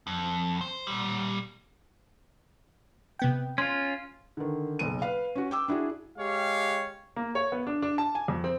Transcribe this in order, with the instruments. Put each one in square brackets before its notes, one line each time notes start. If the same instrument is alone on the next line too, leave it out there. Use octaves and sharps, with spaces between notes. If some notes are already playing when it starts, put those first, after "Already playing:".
[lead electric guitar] F2
C5
A#2 G3
[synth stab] C3 B3 G5
[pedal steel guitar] C#4 F4 [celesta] C6
[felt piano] D3 D#3
F#1 B1 D#7
B4 F5
C#4 F#4
G5 D6 E6
D4 E4 F#4 G#4
[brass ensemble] G#3 G4 C#5 F5
[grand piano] A#3
C#5
B3
D4
D4
A5
G#5
F2
C4